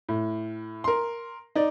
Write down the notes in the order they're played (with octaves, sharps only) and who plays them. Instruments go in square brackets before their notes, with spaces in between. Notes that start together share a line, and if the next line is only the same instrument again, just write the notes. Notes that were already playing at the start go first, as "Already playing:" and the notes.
[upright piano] A2
A#4 C6
D#4 D5